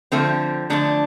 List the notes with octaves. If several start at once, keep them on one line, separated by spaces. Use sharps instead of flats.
D3 F3 A3 C4
D3 F3 A3 A#3 D4